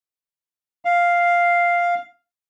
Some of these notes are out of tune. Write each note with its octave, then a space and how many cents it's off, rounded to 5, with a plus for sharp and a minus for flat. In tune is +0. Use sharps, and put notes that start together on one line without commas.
F5 +0